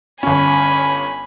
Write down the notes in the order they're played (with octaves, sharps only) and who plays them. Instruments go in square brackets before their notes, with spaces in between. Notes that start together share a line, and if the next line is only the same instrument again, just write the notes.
[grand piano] G1 C#4 [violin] G#5 B5